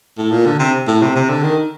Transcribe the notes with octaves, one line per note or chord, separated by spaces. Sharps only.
A2
A#2
D3
C3
A2
C3
C3
D3
D#3